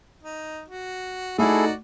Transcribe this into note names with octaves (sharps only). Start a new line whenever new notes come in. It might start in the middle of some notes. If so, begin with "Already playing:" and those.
D#4
F#4
A3 D#4 E4 F#4 G#4 A4 D5